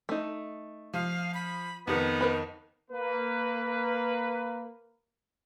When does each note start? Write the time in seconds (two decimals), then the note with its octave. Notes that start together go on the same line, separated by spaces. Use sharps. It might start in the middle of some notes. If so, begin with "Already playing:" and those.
0.09 A3 D#4
0.94 F3 F5
1.34 B5
1.87 F2 D#3 B3 D#4
2.21 A#4 B4 B5
2.91 A#3 B4